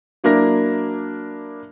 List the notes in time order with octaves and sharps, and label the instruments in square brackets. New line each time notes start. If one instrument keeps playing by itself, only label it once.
[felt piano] F#3 A#3 D4 E4 A#4 A#6